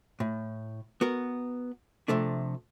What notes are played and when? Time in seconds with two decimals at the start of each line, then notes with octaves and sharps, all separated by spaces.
0.20 A2
1.01 B3 F#4 A#4
2.08 C3 F3 A3 D4